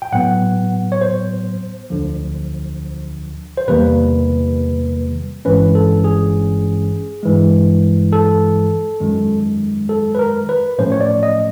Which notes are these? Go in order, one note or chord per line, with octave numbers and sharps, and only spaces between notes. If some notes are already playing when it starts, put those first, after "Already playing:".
G5
A2 F#3 B3 F#5
C#5
C5
D2 D3 F3
C5
E2 C3 D#3 G3 A#3 B4
G1 G2 E3 G#3 C#4 B4
A4
G#4
G2 E3 G#3
A4
F#2 D#3 G#3
A4
B4
A#4
B4
A2 F3 A3 C#4 C5
C#5
D5
D#5